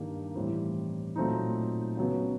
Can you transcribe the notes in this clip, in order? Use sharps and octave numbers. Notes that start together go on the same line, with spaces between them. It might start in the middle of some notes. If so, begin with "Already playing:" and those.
Already playing: G2 D#3 G3 A#3 D4
A2 E3 G3 C4
A#2 F#3 A3 C4 D#4
C#3 F#3 B3